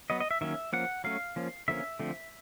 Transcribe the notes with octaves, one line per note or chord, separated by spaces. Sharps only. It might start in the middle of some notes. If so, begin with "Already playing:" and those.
F#3 B3 D#5
D#5
E5
D#3 F#3 A#3 C#4 E5
F3 A#3 C#4 F#5
F#3 A3 C#4 F5
F3 A#3 C#4
D3 F3 A#3 C#4 E5
D3 F3 A3 C4